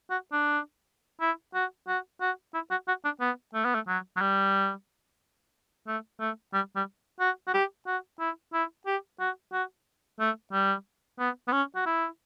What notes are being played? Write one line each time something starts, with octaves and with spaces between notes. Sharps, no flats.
F#4
D4
E4
F#4
F#4
F#4
E4
F#4
F#4
D4
B3
A3
B3
A3
F#3
F#3
G3
A3
A3
G3
G3
F#4
F#4
G4
F#4
E4
E4
G4
F#4
F#4
A3
G3
B3
B3
C#4
F#4
E4